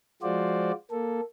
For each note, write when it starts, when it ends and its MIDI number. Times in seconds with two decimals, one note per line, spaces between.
0.22 0.72 53
0.22 0.72 56
0.22 0.72 65
0.22 0.72 66
0.22 0.72 72
0.22 0.72 74
0.91 1.20 58
0.91 1.20 69